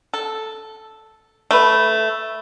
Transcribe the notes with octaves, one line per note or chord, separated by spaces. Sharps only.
A4
A3 B4